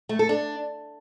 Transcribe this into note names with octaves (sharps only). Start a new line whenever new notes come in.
A3
A4
D4